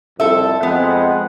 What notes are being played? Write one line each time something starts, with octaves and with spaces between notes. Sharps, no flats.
C2 F2 A4 E5
F2 G#3 B3 F#5